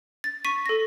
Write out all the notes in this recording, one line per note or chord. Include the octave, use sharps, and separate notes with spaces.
A6
C#6 B6 D#7
A4 A#6